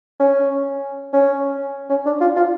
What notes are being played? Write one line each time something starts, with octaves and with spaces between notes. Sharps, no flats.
C#4
C#4
C#4
D4
F4
F4